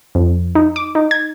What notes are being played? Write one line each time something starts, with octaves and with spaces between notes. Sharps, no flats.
F2
D#4
D6
D#4
G#6